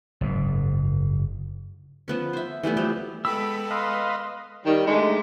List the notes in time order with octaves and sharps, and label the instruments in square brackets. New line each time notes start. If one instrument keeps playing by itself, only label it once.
[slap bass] F#1 G#2
[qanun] F3 B3 C#4
C5 E5
E3 G3 A3 B3
F3 F#3 A3 G4
[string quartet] G#3 B3 A4 [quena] G5 [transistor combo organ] B5 [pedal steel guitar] E6
[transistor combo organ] B4 D#5 F5 [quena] C6
[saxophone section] D#3 G3
G#3 A3 D4 D#4